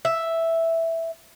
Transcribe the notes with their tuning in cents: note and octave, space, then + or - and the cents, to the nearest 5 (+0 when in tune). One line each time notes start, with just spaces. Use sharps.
E5 +0